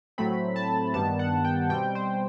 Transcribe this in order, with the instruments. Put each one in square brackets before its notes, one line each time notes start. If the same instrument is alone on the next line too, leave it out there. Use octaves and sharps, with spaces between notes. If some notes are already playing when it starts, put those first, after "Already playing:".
[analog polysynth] A2 F#3 A3 C4 B5
A5
G2 D#3 G3 B3 A5
F#5
G5
B2 G3 C4 G5
C5